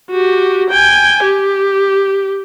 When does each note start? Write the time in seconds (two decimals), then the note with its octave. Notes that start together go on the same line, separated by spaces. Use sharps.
0.11 F#4 G4
0.70 G5 G#5
1.23 G4